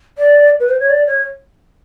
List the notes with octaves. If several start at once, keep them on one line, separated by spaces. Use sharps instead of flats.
D5
B4
C5
C#5
D5
C#5